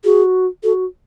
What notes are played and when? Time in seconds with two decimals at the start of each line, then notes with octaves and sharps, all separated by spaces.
0.04 F#4 G#4
0.63 F#4 A4